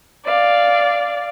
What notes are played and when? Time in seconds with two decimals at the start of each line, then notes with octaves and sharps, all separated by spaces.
0.24 D5 F5